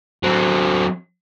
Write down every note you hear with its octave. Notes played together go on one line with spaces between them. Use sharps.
F#3 C4